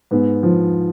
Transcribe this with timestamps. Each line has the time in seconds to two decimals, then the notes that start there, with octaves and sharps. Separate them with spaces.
0.11 G#2 B3
0.43 F3